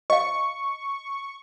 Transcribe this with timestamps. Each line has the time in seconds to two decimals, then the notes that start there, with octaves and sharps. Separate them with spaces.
0.10 D#5 F5 C#6